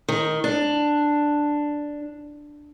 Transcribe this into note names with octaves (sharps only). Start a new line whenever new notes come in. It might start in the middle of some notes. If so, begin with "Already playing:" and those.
D#3
D4